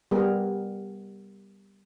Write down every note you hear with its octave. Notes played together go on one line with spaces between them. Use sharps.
G3 B3 G#4 A#4